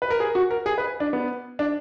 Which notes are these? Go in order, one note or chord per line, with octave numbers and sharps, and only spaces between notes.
B4
A#4
G#4
F#4
A#4
G#4
B4
D4
B3
D4